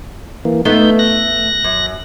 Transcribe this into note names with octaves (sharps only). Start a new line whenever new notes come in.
E3 A#3
A3 B3 D#4 F4 G6
F#6 A#6
F#2